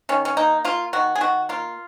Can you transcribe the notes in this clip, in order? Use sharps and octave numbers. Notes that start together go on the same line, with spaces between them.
D#3 C#4
C#4
A#3 D#4
A#3 F4
D#3 F#4
G#4
D#3 F#4
A#3 F4